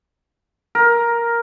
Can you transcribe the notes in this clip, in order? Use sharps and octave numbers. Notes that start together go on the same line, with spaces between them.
A#4